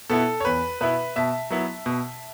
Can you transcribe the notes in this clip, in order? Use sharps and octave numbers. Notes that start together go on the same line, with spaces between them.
B2 B3 E4 A4
C#5
E2 B4
B2 B3 E4 B4 E5
B2 E5 A5
F#3 B3 E4
B2